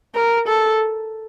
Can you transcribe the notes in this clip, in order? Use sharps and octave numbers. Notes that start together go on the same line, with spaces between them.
A#4
A4